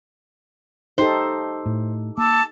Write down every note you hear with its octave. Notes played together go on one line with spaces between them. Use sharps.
D#4 G4 A4 C5
A2
A#3 A5 D6 E6